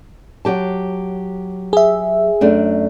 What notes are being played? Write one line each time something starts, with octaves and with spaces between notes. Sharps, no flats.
F#3 G4 A5
G#4 E5
F#2 A3 D4